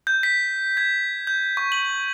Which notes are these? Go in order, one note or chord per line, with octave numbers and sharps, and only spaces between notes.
G6
B6
G#6
G6
C#6
F#7